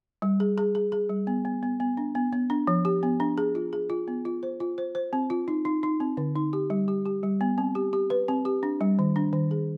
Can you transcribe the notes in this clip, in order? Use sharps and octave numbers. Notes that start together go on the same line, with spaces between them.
G3
G#4
G#4
G#4
G#4
G3
B3
B3
B3
B3
D4
B3
B3
D4
F3
G4
B3
D4
G#4
F4
G#4
F4
B3
F4
C5
F4
C5
C5
C4
F4
D#4
D#4
D#4
C4
D3
D#4
G4
G3
G4
G4
G3
B3
C4
G4
G4
B4
C4
G4
D4
G3
D#3
D4
D#3
G#4